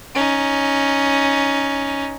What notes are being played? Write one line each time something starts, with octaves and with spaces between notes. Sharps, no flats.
C#4 D#4